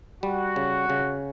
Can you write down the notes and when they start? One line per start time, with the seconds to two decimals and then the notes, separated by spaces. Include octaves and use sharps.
0.23 G3 F#4
0.56 C#3
0.90 C#3